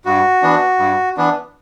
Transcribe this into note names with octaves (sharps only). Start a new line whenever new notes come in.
G2 F#4
E3 B3 D4
G2
E3 B3 D4